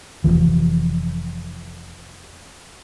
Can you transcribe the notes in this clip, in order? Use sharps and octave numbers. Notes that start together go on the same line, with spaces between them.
F1 D#2 E3 F3